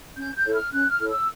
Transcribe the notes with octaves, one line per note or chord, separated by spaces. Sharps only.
C#4 G6
G6
E4 A4 C#5
F6
C#4 F#6
F6
E4 A4 C#5
E6